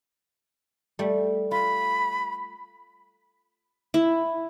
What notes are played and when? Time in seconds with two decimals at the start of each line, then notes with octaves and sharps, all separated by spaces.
0.99 G3 A3
1.51 F4 B5
3.94 E4